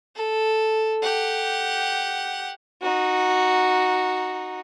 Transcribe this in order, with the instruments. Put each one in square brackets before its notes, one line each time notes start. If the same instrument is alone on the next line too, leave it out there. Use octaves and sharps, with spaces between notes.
[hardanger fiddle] A4
G4 F#5
D#4 F#4